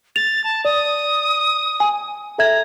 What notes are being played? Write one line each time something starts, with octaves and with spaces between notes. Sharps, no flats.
A6 F7
A5
D5 D#6
G#5
A4 E5 A#5 G#6